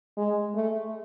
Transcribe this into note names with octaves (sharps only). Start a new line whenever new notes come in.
G#3
A3